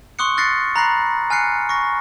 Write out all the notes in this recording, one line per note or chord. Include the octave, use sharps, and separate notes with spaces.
C6 C#6 D#6 F#6 C#7
F6 F#6 A6 A#6 C7 C#7
A#5 B5 F#6 A#6 C7
G#5 F6 F#6 C7 C#7
C#6 A#6